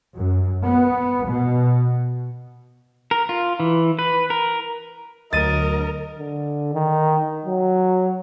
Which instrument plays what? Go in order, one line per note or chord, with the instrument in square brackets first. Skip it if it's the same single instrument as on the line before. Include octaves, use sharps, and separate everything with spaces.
[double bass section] F#2
B3
B2
[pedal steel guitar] A#4
F4
E3
B4
A#4
[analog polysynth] D2 F#3 [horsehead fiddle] A#4 [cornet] D#5 [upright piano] A6 D#7
[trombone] D3
D#3
F#3